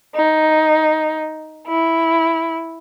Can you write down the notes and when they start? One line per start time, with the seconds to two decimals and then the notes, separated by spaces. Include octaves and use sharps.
0.14 D#4
1.67 E4